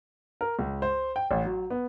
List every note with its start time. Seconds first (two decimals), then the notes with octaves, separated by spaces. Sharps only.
0.41 A#4
0.59 C#2
0.82 C5
1.16 G5
1.31 A1
1.45 F#3
1.71 B3